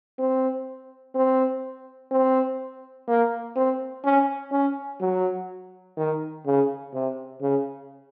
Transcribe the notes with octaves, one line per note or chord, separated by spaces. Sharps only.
C4
C4
C4
A#3
C4
C#4
C#4
F#3
D#3
C#3
C3
C#3